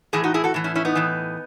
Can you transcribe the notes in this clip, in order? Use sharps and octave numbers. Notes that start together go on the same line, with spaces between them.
A2 E3 E4 G#4
D#4 F#4
E4 G#4
F#4 A4
A2 E3
C#4 E4
C#4 E4
B3 D#4
A2 E3